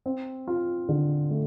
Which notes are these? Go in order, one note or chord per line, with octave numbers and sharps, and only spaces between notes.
C4
F4
D3
A3